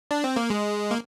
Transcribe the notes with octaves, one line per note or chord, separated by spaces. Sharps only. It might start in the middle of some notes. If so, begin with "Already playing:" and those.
D4
C4
A#3
G#3
A#3